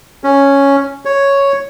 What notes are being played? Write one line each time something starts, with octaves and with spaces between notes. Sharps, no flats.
C#4
C#5